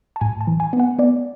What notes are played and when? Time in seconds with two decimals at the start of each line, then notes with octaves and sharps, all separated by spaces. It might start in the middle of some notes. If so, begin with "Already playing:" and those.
0.16 A5
0.21 A2 G#5
0.41 A5
0.47 E3
0.60 G#5
0.73 B3
0.79 F#5
0.99 B3 D5